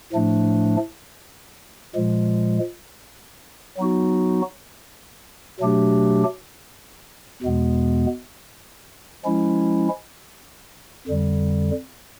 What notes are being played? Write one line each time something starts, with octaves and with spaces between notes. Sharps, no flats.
A2 F3 A3 D4
A#2 F3 G#3
F#3 B3 D#4 F#4
B2 F#3 A3 D4 G4
E2 B2 G#3 B3
F3 G#3 C#4 E4
F2 D3 G3